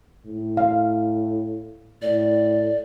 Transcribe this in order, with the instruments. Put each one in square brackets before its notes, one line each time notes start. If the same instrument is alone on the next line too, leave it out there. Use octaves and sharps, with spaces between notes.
[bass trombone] A2
[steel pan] F5
[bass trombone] A2 [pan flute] D5